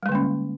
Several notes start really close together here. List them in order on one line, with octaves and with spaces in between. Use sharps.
G3 G#3 D3 A#3 C#4